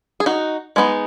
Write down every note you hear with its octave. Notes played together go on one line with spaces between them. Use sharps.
G#4
D#4 F#4
G#3 B3 D#4